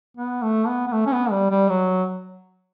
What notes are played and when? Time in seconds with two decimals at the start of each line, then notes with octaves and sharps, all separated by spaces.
0.17 B3
0.43 A3
0.67 B3
0.88 B3
0.93 A3
1.06 C#4
1.13 B3
1.31 G3
1.51 G3
1.69 F#3